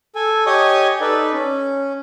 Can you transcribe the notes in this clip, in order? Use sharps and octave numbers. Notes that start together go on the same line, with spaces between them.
A4 G#5
G4 C#5 D#5 G#5 C#6 D#6
D#4 A4 B4 D5
C#4